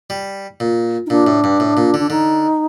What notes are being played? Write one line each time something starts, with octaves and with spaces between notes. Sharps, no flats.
G3
A#2
D#4
A#2 D4
A2
G2
A2
A#2
D3
D4
D3 D#4